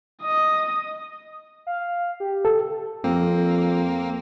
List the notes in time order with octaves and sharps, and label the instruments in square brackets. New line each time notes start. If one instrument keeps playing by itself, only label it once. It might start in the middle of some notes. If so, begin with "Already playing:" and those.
[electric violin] D#5 D#6
[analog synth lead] F5
G4
[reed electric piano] A4
[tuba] F2 [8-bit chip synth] A#3 [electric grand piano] C4